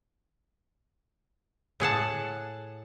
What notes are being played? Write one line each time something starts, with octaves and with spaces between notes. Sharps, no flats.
A2 G#4 F#5 A5